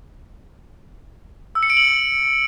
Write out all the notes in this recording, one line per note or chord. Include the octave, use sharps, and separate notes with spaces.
E6
C#7
D7
F#7